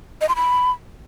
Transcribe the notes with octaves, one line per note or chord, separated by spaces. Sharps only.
D#5
C6
B5